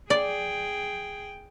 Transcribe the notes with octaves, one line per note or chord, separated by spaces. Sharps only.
G#4 D5 G5